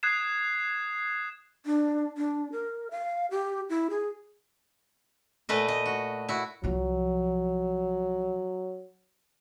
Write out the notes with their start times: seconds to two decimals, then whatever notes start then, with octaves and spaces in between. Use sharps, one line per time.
0.03 D#6 F#6 G#6 C7 E7
1.66 D4
2.18 D4
2.52 A#4
2.91 F5
3.31 G4
3.69 E4
3.90 G#4
5.49 A#2 A3 B4 D#5
5.68 D#5
5.86 F#4
6.29 E4 F#4
6.64 C2 F3 F#3